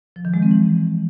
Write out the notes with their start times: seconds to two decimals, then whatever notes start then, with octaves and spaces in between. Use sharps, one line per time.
0.16 F3
0.25 D#3
0.34 G#3
0.42 C4
0.51 E3